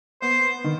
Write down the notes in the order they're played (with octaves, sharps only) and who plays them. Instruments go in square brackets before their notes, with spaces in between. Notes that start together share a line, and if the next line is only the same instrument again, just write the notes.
[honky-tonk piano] B3 [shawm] C5
[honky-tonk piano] D#3